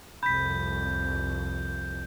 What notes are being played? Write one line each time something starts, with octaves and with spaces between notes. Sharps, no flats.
C2 F2 B5 G6 B6